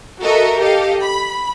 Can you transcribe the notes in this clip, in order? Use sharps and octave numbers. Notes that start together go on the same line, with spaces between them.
F#4 A4 A#4 D#5 E5
G4 A4 D#5 F5
B5